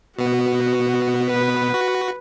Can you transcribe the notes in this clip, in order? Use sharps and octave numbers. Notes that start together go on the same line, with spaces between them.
B2 B3 F#4
B4
F#4